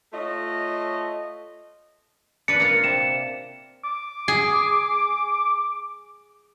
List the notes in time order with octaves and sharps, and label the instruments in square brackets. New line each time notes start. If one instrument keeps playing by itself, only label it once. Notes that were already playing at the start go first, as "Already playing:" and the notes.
[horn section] A3 F4 C#5 D#5
[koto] D4 B4 [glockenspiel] C#7
[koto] A#3 F4
[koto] C3 [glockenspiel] E7
[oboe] D6
[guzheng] G#4